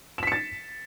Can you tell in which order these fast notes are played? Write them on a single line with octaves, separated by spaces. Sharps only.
E7 B6 C#7 A6